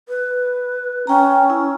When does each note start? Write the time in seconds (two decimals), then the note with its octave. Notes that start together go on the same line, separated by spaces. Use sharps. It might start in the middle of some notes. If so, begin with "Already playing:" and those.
0.09 B4
1.07 C#4 G5 A#5
1.50 E4